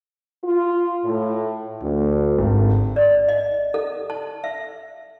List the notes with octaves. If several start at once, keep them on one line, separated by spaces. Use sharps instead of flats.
F4
A2
D2
G#1
D5
D#5
A4
A5
E5